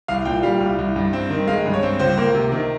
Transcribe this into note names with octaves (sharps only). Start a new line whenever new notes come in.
C2 F5
A#2 G5
G3 F5
C2
C2
G2
C4
D#3
G#3 F5
G2
C#5
C4
C#2 C5
A#3
C3
D#3